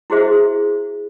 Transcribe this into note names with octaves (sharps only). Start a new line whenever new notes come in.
E4 F#4 G#4 C5 E5